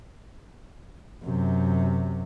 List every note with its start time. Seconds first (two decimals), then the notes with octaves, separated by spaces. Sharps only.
1.24 F#2 C3